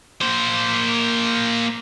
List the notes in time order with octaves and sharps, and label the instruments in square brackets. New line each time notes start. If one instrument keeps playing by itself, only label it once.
[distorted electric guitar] A#3 C5